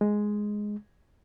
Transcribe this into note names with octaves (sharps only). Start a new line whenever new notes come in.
G#3